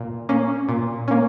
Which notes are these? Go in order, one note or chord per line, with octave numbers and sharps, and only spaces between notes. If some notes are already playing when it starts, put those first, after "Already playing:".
Already playing: A#2
A#3 C#4
A#2
A#3 C#4